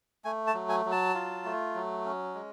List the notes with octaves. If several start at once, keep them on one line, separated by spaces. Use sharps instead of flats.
A3 G#5
A5
F#3
G#5
F#3
A5
F4
A3
F#3
C#4
G#3